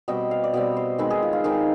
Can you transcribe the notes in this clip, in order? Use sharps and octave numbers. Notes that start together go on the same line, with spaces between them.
B2 G3 C4 D#5
F5
D5
B2 G3 C4 D#5
C5
D#3 G#3 C4 B4
G#4
F4
F4
D#3 G#3 C4 D#4